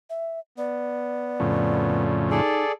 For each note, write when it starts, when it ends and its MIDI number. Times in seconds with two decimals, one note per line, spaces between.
0.10 0.39 76
0.58 2.04 59
0.58 2.28 74
1.40 2.41 41
1.40 2.41 45
1.40 2.41 49
2.31 2.64 63
2.31 2.72 68
2.31 2.72 69
2.31 2.72 74